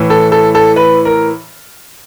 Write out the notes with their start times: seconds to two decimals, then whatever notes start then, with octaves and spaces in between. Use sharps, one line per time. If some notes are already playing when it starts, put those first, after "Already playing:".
Already playing: A2 E3
0.10 A4
0.32 A4
0.55 A4
0.76 B4
1.05 A#4